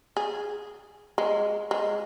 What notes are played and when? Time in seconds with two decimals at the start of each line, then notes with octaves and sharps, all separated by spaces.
0.17 G#4
1.18 G#3
1.71 G#3